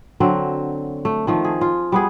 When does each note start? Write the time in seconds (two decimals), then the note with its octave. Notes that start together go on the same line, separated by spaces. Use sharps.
0.20 D3 F#3 C4
1.05 A3
1.27 D#3 F3 A3
1.44 G#4
1.61 F4
1.92 G3 B3 G#4